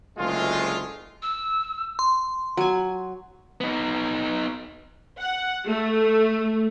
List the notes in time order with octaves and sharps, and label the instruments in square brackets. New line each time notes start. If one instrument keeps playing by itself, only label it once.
[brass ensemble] F#1 D2 G#3 A3 F4
[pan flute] E6
[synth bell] C6
[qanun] F#3 G#5
[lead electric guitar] B3 D#4
[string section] F#5
A3